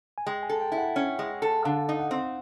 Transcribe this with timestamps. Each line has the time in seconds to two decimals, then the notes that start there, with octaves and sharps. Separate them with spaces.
0.18 G#5
0.27 G#3 G5
0.43 G#5
0.49 A4
0.61 G5
0.72 E4
0.78 F#5
0.96 C#4
1.19 G#3
1.42 A4
1.64 D3 F5
1.89 D#4
2.00 F#5
2.11 C4